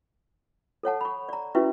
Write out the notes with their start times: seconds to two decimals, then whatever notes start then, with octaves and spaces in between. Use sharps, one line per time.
0.83 A4 C#5 F#5 A5
1.01 B5 C#6
1.29 D5 A#5
1.55 C#4 E4 F#4 B4 E5 C#6